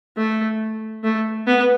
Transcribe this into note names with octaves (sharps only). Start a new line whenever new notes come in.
A3
A3
B3